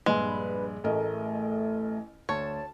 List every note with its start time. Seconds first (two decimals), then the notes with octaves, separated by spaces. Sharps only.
0.06 A#1 G2 G#3 B4 G#5
0.84 A1 A3 A#4 D#5
2.29 D2 C#5 A5